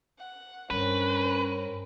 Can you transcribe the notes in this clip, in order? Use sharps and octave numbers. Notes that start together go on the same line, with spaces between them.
F#5
G2 C4 C#4 A#4 B4